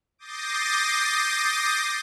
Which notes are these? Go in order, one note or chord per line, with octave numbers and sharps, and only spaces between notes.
D6 D#6 G6 A6 A#6 C7